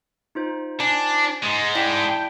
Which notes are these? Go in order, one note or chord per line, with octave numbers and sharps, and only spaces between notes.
D#4 F4 C5
D4 G#5
G#2 G#3 C6 D#6 A6
D4 E4 G5 B6